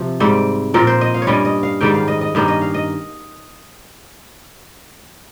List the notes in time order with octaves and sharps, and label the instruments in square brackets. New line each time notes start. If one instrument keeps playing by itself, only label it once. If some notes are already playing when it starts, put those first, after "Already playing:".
Already playing: [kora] C3 F3
G#2 G3 C4
A#2 F3 C4 A#4
C5
D#5
F5
C#5
G2 G3 C#4 D#5
D#5
F5
G#2 D#3 G3 G5
F5
D#5
D#5
G2 D#3 A#3 C#4
D#5
F5
D#5